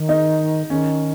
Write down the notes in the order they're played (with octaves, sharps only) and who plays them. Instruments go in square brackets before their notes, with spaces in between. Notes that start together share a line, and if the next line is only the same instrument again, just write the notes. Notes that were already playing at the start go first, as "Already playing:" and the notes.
Already playing: [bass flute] D#3
[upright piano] D#4
[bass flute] D#3 [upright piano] C#4